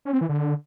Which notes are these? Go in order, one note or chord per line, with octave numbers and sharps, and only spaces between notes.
C#4
C4
E3
D3